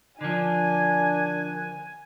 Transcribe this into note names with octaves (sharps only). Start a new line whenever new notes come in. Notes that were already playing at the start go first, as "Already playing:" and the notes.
D3 F3 D4 A#4 G#5 F#6 G#6